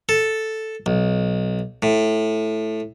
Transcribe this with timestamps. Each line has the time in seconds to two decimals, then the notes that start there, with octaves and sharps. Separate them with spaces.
0.09 A4
0.86 B1
1.82 A2